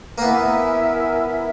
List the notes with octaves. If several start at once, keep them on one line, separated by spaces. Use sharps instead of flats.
A#3
B3 E4 A#4 E5 G#5